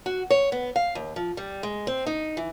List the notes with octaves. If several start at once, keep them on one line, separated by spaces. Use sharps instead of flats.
F#4
C#5
B3
F5
D#2
F3
G3
G#3
C4
D#4
E3